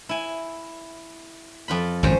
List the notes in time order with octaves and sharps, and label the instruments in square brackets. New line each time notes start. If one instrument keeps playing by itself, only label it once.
[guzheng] E4 G#5
F2 F4 B5
[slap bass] G#1 F#2 [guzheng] C#4 C5